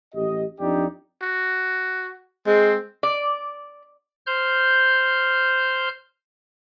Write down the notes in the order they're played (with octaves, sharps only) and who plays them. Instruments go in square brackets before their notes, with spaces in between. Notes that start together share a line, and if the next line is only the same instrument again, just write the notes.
[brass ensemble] A1 G4 D#5
F2 D4 D#4 G4 D5
[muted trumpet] F#4
[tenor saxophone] G#3 [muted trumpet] C4
[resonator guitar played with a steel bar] D5
[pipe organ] C5 F6 G6